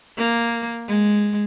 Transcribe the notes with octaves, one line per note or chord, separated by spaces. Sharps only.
A#3
G#3